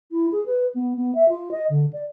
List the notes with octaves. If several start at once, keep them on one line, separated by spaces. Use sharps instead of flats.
E4
G#4
B4
B3
B3
E5
F4
D#5
D3
D5